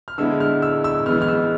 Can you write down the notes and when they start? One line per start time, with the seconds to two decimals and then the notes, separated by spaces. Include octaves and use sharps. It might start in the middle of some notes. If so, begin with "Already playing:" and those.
0.08 F6
0.18 D3 G#3 B3 E4 E6
0.40 F6
0.62 E6
0.84 E6
1.06 E3 G#3 B3 F6
1.22 F6
1.28 E6